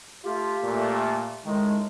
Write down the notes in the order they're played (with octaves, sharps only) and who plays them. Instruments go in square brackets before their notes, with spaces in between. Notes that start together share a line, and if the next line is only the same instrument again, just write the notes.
[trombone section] A3 F4 [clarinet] G4
[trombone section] A#2 A3
[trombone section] C#2 A2 D#3 [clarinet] G#3